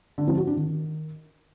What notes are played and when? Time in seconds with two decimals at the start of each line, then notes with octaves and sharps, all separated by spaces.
0.18 D3
0.28 F3
0.37 F#4
0.47 D4
0.57 D#3